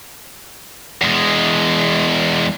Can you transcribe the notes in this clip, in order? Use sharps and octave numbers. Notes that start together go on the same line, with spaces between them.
E2 G#3